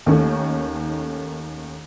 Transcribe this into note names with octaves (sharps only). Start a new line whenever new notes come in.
D#2 D#3 A3 C#4